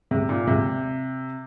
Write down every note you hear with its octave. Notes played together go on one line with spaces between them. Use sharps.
C3
A#2
C3